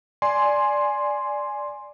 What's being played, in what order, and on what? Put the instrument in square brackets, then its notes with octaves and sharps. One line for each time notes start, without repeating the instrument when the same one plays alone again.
[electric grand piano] D5 G#5 C6